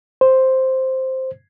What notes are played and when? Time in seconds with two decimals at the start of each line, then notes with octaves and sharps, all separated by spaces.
0.21 C5